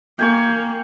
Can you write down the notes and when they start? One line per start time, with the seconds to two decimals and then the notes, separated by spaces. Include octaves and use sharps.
0.19 A#3 G5 G#5 C#6